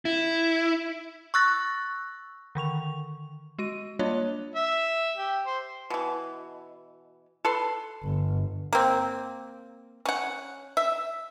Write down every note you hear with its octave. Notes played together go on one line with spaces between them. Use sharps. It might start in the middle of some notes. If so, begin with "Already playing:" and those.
E4
C#6 E6 F#6 A6 A#6
D3 D#3 C#6 F7
G#3 F#4 D#7
G3 A#3 D4 F4 C#5 D#5
E5
G4
C5
B2 E3
A4 B4 C6
G1
A#3 C4
C#4 F#5
E5